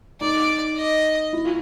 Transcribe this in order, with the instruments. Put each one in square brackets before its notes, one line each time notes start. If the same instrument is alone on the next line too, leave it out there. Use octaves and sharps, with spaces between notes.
[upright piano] D#4 [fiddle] D5
[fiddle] D#5
[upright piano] E4
F4